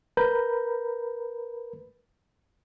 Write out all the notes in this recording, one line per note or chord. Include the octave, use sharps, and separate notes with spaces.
A#4 B4 A#5 B5 G6